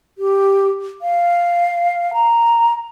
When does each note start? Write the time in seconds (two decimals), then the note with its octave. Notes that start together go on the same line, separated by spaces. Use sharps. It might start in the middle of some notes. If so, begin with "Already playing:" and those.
0.18 G4
1.02 F5
2.13 A#5